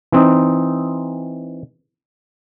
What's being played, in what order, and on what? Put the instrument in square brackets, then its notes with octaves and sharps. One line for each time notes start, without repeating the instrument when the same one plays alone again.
[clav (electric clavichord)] E3 C4 D#4